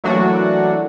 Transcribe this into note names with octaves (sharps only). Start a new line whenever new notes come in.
E3 F#3 A3 A#3 D4 F#4